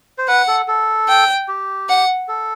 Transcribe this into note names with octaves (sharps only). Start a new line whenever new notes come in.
C5
B4 F#5
A4
A4
G5
G4
F#5
A4